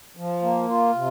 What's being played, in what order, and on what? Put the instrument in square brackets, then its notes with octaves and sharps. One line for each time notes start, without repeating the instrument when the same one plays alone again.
[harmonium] F3
A#3
F4
C3